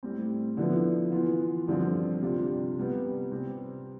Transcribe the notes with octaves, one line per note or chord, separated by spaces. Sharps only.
A2 G3 C4
D3 F3 B3 E4
E3 B3 F4
G2 D3 F3 C4 F4
C3 G3 D4 F4
C3 G3 B3
C3 G3 C4